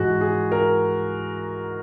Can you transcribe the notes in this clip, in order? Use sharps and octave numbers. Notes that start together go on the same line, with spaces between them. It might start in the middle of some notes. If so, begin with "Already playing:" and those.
Already playing: G#2 E3 F#4 G#4
G#4
A#4